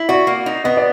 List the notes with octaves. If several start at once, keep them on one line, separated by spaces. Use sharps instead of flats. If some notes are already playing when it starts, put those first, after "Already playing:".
Already playing: E4
F#4 D5
A#3
D#4
B3 D#5
D5